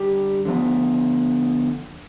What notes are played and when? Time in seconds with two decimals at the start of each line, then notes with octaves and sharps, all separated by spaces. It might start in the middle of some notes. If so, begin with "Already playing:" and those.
Already playing: D3 G3 D4 G4
0.45 D3 F3 B3